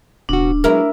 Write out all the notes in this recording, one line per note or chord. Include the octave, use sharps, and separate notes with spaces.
D1 B2 D4 F#4
F#3 G#3 B3 E4 A#4